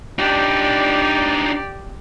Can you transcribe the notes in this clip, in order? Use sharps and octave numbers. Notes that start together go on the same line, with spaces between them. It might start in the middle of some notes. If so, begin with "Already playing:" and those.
D4 D#4 G4 D5